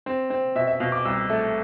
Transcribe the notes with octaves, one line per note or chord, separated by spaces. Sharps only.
C4
C4
B2 E5
E5
B2 F5
D6
C2 E6
A3